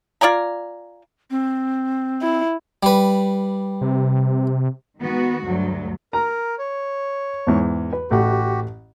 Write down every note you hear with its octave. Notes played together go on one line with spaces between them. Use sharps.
F4 D5 G#5 A#5
C4
E4
G3 B4
C3
D#3 G#3 B3 F#4
D2 G2 F#3
A#4 A#5
C#5
E2 G#2
B4
A1 A3 F#4 G4 F#5